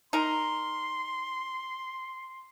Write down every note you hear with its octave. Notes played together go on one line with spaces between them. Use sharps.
D#4 A#4 C6